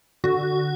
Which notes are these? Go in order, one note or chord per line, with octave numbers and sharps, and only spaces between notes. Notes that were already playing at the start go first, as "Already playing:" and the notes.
D3 F#4